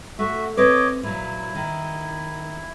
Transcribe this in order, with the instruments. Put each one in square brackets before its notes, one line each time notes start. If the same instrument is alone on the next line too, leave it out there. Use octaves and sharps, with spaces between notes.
[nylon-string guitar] A3 [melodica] F#4 E5
[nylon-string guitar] C4 B4 [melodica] C#5 D#5 D6
[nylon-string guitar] A#2 F#3 [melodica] E4
[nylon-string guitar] D#3